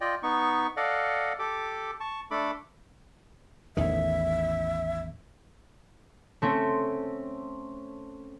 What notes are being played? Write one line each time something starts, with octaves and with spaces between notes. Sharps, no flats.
F4 D5 D#5 G5
B3 D#4 C#6
A4 D5 D#5 F5 F#5
G4 A4 D6
A5 C#6
A3 D4 A4 B5 D6
A1 E2 D#3 E5
A3 C4 C#4